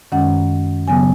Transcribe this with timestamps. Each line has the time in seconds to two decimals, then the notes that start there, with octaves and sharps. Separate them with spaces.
0.12 F#2 D#3 G#3 C#4 F#5
0.87 C#3 F#3 B3 G#5